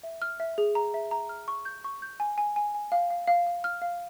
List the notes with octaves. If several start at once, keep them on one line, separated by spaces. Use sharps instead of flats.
E5
F6
E5
G#4
A#5
E5
A#5
F6
C#6
G6
C#6
G6
G#5
G#5
G#5
G#5
F5
F5
F5
F5
F6
F5